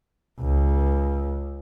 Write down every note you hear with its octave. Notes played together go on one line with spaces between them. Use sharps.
C#2